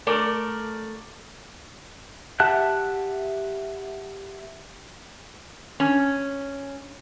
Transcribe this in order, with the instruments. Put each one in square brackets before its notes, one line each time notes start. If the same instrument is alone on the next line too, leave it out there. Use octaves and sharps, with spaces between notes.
[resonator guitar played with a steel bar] A3 A#4 D5
[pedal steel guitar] G4 E5 F#5 A5 F#6
[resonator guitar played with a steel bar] C#4